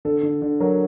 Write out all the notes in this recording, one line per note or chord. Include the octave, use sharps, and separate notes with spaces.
D3 A4
D3
D3
F#3 A#4